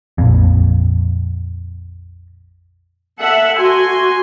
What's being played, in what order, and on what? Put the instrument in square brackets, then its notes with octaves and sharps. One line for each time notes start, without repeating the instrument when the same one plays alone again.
[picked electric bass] A#1 F2
[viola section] A4 E5 F#5
[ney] F#4 [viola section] G#5 C6